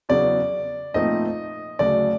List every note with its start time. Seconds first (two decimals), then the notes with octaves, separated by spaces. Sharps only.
0.09 E2 C#3 F#3 B3 D5
0.94 A#2 F3 A3 C4 D#4 D#5
1.79 D2 C#3 F#3 A3 D5